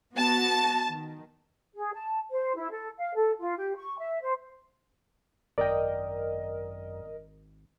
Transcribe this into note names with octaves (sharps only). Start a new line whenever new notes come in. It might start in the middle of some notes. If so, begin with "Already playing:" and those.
B3 F#4 A5
D#3
G#4
A5
C5
E4
A4
F5
A4
F4
G4
C#6
E5
C5
G#1 F#2 A#4 D5 D#5 G5